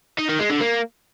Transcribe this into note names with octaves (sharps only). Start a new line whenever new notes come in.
D#4
D#3
G#3
D3
A#3